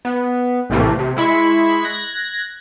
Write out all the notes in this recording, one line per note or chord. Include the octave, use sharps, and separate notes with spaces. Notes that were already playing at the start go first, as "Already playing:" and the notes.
B3
A#1 A2 C3 E3 A3 A#3
C3
G#3 E4 B5 C#6
F#6 G#6 A#6